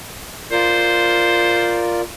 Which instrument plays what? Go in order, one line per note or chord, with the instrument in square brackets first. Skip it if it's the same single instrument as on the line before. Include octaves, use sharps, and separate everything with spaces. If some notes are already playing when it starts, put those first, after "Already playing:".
[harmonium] F4 A#4 D5 [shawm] C5